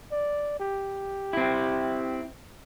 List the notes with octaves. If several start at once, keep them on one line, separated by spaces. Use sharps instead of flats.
D5
G4
C4 E4